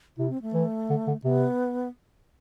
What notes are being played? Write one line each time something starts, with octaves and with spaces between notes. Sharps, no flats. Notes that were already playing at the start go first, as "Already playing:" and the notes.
C3 E4
C4
A3
E3
D3
D3
C3 B3